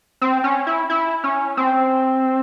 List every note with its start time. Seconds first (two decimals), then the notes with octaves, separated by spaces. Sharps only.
0.21 C4
0.44 C#4
0.67 E4
0.90 E4
1.24 C#4
1.57 C4